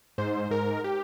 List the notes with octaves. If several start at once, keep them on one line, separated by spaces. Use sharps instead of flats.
G#2 C5
G#2 A#4
G4